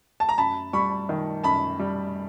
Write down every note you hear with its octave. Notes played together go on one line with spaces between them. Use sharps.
A5
A#5
F#2 A5 B5
G3 B5 C#6
D#3
F#2 A5 B5
G3